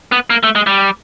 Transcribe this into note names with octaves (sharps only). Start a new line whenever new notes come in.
B3
A#3
A3
G#3
G3